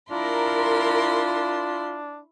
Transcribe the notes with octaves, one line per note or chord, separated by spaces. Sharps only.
D4 E4 F4 A#4 C6